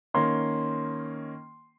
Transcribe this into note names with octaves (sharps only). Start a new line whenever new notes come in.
D#3 A#3 C#4 C6